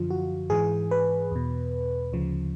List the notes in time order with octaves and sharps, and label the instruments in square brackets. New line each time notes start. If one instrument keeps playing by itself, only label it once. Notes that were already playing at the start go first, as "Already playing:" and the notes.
Already playing: [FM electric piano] F#2 D3 F3 F4
F#4
G#2 E3 G#4
B4
E2 B2
D2 C#3 F3